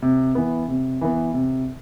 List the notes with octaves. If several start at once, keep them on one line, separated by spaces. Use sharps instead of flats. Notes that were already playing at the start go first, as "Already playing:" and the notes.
C3
E3 B3
C3
E3 B3
C3